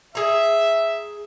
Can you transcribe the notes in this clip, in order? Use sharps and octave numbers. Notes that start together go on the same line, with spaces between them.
G#4 E5 A#5